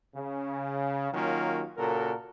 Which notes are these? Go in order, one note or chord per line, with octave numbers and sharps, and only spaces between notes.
C#3
D#3 F#3 A#3 C#4 F4 F#4
A#2 C#3 F#4 A4 A#4